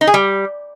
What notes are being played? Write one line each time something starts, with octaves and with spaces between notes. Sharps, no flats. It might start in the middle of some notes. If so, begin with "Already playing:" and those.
D#4
G#4
G3